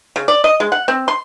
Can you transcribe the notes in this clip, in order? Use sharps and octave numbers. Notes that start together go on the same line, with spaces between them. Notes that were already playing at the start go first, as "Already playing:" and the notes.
C#3
D5
D#5
G#3
F#5
C4
C6